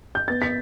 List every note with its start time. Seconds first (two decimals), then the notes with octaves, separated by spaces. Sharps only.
0.15 G6
0.28 B3 A6
0.42 B6